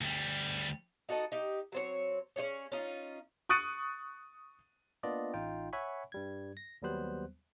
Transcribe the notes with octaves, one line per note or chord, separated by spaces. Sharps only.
D2 G3
D#4 F#4 A4 D#5
D#4 G4
F#3 C4 C#5
C#4 D#4 G#4 C#5
C#4 D#4 F4
C#6 D#6 F#6 A6 C#7 D#7
A#3 B3 D4 F4 D5 D#5
A1 D#4 F4 G5
C#5 E5 F#5 G#5 B5 C#6
G2 G3 G#6
A#6
D#2 F#3 G3 B3 C5 F#6